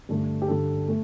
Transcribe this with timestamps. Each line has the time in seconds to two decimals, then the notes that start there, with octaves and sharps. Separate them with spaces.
0.09 G2 D3 A3
0.42 G4
0.48 G2 D3 G3 A4
0.88 A3